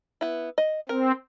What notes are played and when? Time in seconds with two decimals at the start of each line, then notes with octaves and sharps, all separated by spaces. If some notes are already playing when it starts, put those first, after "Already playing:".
0.21 B3 E4
0.58 D#5
0.89 C4 A#4